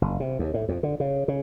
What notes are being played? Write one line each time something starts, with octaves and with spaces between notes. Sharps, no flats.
F#1
C3
D#2
A2
F2
D3
C#3
C#3